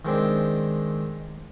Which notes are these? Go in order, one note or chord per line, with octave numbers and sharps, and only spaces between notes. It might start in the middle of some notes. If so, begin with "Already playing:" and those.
D#3 G#3 C4 D4